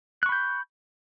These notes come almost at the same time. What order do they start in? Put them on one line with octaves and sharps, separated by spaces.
F#6 C#6 B5 G6